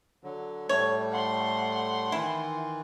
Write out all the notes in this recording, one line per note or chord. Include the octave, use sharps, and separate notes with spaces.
D3 F#3
A2 G3 A3 C#5
F#5 C6
D#3 E3 E4